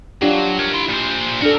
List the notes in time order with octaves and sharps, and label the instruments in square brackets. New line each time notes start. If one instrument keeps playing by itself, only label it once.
[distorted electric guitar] F#3 [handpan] D4 F4 G4
[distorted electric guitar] A#4 C#5
E4 C6
A#2 C5
[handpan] D4 A4 [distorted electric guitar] F#4 A#4